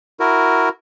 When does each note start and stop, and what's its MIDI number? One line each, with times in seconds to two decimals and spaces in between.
0.20 0.69 64
0.20 0.69 66
0.20 0.69 70